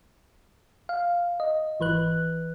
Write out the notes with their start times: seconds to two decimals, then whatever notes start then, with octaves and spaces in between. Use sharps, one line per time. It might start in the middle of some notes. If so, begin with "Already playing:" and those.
0.89 F5
1.40 D#5
1.80 G#1 E3 B4 F#6